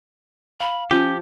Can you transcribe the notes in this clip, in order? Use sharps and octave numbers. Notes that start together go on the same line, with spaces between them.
F5 B5
F3 C#4 G4 G6